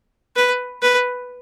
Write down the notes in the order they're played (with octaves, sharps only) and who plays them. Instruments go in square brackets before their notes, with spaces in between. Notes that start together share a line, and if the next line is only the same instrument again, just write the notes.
[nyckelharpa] B4
B4